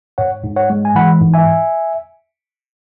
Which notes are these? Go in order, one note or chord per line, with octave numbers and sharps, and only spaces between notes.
G#2 C#5 F#5
G#2
C#5 F#5
G#3
G#5
E3 F#5 B5
G#2
E5 G#5